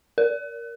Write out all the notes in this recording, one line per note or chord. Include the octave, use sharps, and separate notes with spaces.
A#4